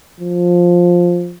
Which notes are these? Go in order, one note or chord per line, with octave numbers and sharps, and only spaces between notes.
F3